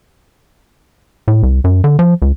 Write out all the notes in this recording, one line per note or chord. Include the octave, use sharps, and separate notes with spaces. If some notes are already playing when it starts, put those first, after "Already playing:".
A2
C2
F#2
D3
F3
C#2